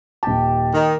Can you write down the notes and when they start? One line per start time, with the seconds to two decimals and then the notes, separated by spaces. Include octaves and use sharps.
0.23 D#1 G4 A5
0.73 D#3